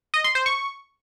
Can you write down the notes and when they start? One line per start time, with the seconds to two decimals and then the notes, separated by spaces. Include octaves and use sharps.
0.14 D#5
0.24 C6
0.35 C5
0.46 C#6